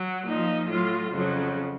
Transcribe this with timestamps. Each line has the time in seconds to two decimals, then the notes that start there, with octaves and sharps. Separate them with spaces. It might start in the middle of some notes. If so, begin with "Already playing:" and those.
Already playing: F#3
0.27 A#2 F3 D#4
0.70 A2 F#3 F4
1.13 F2 C#3 F#3